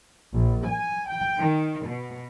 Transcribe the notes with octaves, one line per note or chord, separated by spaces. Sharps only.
A#1
G#5
G5
D#3
B2